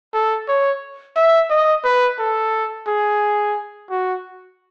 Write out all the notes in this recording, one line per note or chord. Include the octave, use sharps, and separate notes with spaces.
A4
C#5
E5
D#5
B4
A4
G#4
F#4